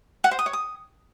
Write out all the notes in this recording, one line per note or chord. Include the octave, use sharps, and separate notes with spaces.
F#5
C5
D#6
C#5
D#6